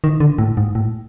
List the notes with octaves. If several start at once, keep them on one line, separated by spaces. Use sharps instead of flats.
D#3
D3
A2
G#2
A2